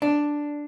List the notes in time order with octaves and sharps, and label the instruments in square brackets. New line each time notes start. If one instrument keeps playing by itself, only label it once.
[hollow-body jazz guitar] D4